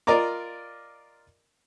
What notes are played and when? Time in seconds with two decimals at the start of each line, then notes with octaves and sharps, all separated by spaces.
0.07 F4 A#4 D5 D#5 A#5 D6